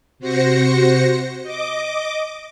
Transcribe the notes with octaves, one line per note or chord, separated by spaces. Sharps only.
C3 F#4 C5 A#6 C#7
D#5 D6